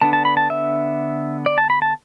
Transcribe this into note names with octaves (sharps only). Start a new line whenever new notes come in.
D3 B3 D4 A5
A5
B5
A5
E5
D5
A5
B5
A5